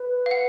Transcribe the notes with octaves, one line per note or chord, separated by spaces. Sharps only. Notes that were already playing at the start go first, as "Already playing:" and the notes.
Already playing: B4
F5
F#5